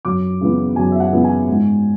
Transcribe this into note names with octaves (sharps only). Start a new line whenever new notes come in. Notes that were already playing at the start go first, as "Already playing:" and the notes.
F#2 D6
C#3 E3 B3
F#2 G#5
E5
F#5
C#3 E3 B3
G#5
G#2